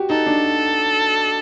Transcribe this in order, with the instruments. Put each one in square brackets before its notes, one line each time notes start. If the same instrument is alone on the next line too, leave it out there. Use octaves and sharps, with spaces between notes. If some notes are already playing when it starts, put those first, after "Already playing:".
Already playing: [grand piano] F#4 G4
[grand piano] D#4 [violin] A4
[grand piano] D4